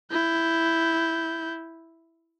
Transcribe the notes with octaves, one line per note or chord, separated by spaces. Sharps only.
E4 G6